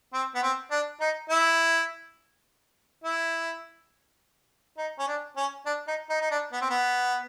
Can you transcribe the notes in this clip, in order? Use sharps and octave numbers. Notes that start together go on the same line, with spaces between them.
C4
B3
C4
D4
D#4
E4
E4
D#4
C#4
D4
C#4
D4
D#4
D#4
D#4
D4
B3
C4
B3